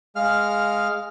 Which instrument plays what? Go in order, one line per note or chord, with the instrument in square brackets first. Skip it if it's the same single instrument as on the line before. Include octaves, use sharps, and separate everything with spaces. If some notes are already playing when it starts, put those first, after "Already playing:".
[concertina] G#3 F5 F6